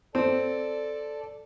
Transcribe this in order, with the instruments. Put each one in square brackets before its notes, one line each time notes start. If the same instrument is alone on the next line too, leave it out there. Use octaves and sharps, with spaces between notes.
[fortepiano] C4 [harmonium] A4 D5 A5